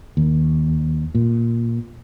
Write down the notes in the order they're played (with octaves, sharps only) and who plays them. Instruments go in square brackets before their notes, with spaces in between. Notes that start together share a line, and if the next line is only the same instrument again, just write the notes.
[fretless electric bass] D#2
A#2